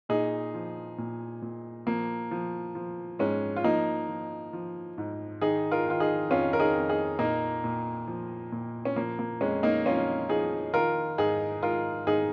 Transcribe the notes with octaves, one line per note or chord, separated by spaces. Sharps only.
A#2 D#4 G#4
F3
A#2
A#2
F3 A#3
F3
F3
G#2 G#3 C#4
F4
F3 A#3 D#4
F3
F3
G#2
D#3 D#4 G#4
F4 A#4
D#3 F4
D#4 G#4
F2 C#4 F4
A#4
D#4 G#4
F2
D#4 G#4
A#2 A#3 D#4
A#2
F3
A#2
C#4
F3 A#3
A#3
F2 G#3 C#4
A#3 D#4
F2 C#4 F4
F3 D#4 G#4
D#3 F4 A#4
G#2 D#4 G#4
G#2 F4 A#4
G#2 D#4 G#4